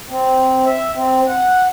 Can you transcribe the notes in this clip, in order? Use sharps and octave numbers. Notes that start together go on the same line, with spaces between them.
C4
E5
C4
F#5